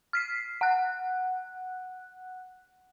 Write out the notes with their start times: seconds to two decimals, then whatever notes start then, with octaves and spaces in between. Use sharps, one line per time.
0.13 F6 B6 C7
0.61 F#5 F#6